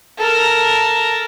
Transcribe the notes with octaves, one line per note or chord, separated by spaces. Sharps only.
A4 A#4